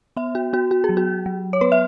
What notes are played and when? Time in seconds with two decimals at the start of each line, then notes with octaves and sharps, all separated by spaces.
0.17 B3 E5
0.35 F#4
0.53 B3 F#4
0.71 F#4
0.84 G#4
0.89 F#3
0.97 F#4
1.26 F#3
1.53 C#5
1.61 B3 B4
1.72 E5